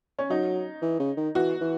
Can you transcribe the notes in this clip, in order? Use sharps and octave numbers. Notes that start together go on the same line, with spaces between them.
C#4
F#3 D#4
E3
C#3
D#3
E3 F#4
E3